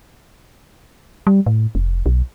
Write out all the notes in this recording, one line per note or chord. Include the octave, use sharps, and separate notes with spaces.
G3
A2
F1
B1